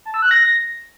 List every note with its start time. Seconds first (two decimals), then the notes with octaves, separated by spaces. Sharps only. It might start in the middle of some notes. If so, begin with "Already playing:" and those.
0.05 A5
0.14 E6
0.22 F#6
0.31 A#6